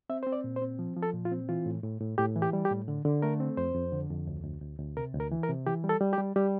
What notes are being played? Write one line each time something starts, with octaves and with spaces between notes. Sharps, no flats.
C4 E5
C4 C5
D5
A#2
C5
C4
F3
F3
A4
A#2
F4
C4
E3 F4
A2
A2
A2
A2 G4
E3
G4
G3
G4
A2
D3
D3
A3 A#4
C4
F2 C5
F2
D3
F2
D2
D2
D2
D2
C3 A#4
D2
A#4
E3
A#4
C3
E3 G4
G3
A4
G3
G4
G3
G3 G4